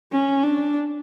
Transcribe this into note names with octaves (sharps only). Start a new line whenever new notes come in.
C#4
D4